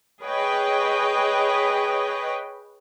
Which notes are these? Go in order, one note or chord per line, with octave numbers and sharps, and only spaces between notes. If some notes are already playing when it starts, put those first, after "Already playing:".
G#4 B4 C#5 D#5 G5